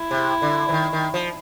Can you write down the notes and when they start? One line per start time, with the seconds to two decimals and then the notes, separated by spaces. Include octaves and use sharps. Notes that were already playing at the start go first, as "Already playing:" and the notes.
Already playing: E4
0.11 C3
0.42 D3
0.69 E3
0.72 D#3
0.93 D#3
1.14 F3